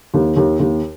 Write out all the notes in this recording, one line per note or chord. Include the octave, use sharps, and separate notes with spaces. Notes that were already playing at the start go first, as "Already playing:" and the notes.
D#2
D#2
D#2